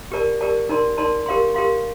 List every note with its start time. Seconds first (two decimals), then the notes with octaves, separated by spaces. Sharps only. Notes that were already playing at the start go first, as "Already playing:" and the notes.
0.12 G4 A#4 D5 A5
0.41 G4 A#4 D5 A5
0.69 D#4 A#4 D5 A5 C6
0.98 D#4 A#4 D5 A5 C6
1.26 G4 A#4 F5 C6
1.55 G4 A#4 F5 C6